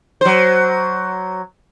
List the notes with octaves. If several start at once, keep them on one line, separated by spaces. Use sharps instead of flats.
F#3 C5